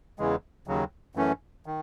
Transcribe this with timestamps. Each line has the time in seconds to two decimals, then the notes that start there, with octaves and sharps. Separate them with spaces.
0.19 E2 C#3 E3 G#3
0.67 D#2 C#3 F#3
1.15 F#2 E3 A3 C#4
1.66 D#3